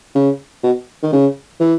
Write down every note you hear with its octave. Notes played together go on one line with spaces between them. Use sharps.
C#3
B2
D#3
C#3
E3